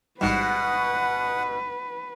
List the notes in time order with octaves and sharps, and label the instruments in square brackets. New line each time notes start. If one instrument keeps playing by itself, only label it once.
[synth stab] A1 G#2 G3 [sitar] B2 [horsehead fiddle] B4 [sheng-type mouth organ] F#5